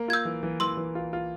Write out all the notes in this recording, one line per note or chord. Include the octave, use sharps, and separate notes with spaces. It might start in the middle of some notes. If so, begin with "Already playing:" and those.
Already playing: A#3
F4 G#6
E6 G6
E3
E3
E3 C6 E6
E3
F4
F4